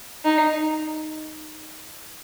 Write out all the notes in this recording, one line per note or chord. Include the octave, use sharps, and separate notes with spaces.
D#4